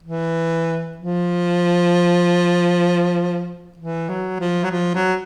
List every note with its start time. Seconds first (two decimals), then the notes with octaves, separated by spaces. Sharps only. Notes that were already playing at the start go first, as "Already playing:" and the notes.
0.03 E3
0.97 F3
3.78 E3
4.09 F#3
4.40 F3
4.64 F#3
4.71 F3
4.95 F#3